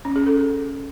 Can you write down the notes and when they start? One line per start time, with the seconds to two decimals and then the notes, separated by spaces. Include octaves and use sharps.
0.05 C#4
0.16 G#4
0.26 A4